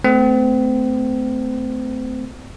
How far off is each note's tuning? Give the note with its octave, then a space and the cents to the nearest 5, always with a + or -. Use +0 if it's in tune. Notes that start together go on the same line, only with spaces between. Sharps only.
A3 +0 C4 -35